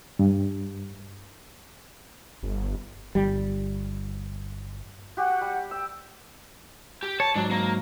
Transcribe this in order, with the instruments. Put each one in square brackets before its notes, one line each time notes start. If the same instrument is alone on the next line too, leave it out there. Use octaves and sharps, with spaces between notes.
[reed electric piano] G2
[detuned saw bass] G1
[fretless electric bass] G1 G3
[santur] F#4 G4 [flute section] F#5
[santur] G3
[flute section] G5 [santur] E6
[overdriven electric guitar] G4
[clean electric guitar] C#5 [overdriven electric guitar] A5
[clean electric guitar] G#2 F#3 [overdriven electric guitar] D4
[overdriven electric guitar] A#3